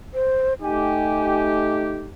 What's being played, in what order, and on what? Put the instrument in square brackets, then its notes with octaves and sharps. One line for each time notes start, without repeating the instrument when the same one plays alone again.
[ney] C5
[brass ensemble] A3 D#4 G4 [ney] G#5